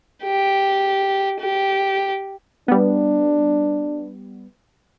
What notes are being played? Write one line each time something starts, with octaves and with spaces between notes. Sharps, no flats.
G4
G4
G3 B3 D4